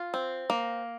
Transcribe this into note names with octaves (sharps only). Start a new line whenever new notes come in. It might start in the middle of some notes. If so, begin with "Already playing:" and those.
Already playing: F4
C4
A#3